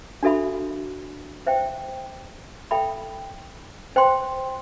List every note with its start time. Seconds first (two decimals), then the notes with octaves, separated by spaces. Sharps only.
0.23 D4 F#4 A4 E5 B5
1.47 C5 E5 G5
2.71 A4 E5 G5 B5
3.96 C5 G5 C6